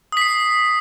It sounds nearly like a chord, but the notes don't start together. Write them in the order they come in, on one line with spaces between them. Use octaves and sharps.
D#6 B6 C7